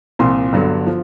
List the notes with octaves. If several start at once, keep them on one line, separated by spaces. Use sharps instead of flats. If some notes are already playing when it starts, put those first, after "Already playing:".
C2 A#2 F3 C6
G1 G2 D3 F#3
F3